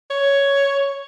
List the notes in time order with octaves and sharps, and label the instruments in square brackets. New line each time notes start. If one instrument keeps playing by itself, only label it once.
[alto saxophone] C#5